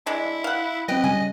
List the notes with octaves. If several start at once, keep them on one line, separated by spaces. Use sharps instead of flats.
G#3 D4 E4
E5
F5 F#5
F#3 B3 C4 B4 D#5 G5
C#3 G3 G#5